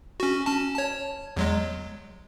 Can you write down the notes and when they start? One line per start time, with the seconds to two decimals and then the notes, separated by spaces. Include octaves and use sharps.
0.20 C#4 F#4
0.46 C#4 A5
0.75 C#5 A5
1.36 E2 F#3 G#3